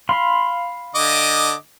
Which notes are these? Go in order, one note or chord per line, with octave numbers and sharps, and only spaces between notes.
F5 B5 C6
D3 D#5 D6